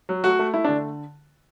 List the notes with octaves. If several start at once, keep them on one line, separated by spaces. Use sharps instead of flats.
F#3
A3 F#4
A3
A3 E4
D3 D4